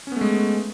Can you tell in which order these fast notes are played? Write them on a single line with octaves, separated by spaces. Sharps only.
C#4 B3 A3 G#3